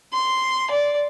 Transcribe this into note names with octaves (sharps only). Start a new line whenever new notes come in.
C6
D5